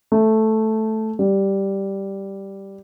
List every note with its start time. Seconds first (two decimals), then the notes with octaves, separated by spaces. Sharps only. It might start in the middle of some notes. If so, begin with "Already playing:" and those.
0.12 A3
1.19 G3